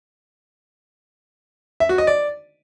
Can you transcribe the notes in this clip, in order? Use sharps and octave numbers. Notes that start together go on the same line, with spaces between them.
E5
F#4
D#5
D5